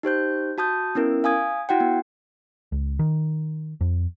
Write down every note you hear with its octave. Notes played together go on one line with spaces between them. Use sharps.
D#4 G4 C5 G6
F#4 A5 D#6 G6
B3 C#4 E4 A#4
F5 G#5 D#6 G#6
E4 F#4 F#5 G5
B3
C#2
D#3
F2